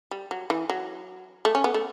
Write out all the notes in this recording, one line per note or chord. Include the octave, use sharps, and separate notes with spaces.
G3
F#3
E3
F#3
A3
C#4
B3
A3